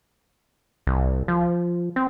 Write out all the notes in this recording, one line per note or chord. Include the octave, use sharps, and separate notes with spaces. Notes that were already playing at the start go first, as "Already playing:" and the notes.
C2
F3
C4